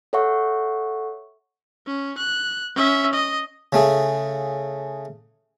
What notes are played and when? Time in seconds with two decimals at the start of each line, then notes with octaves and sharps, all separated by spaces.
0.13 A4 C#5 E5 F#5 C#6
1.87 C#4
2.18 F#6
2.75 C#4 E5
3.13 D#5
3.73 C#3 A3 G#4